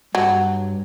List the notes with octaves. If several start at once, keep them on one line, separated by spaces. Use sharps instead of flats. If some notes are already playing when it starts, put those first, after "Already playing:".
G2 F#3